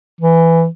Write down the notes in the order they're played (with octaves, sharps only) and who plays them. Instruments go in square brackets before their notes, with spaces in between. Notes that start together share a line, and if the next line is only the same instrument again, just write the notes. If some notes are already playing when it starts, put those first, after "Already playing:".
[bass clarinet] E3